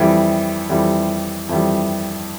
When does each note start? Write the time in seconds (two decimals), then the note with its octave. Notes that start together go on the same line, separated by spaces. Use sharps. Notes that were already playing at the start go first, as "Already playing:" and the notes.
Already playing: F2 E3 G3
0.69 F2 E3 G3
1.49 F2 E3 G3